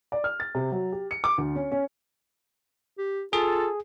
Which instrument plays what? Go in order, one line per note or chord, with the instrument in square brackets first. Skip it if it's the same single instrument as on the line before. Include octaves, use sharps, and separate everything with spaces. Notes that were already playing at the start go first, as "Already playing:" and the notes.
[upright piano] D5
F6
A6
C3
F#3
G4
C#7
D6
D2
C#4
C#4
[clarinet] G4
[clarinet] F4 [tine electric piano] G#4 [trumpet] A4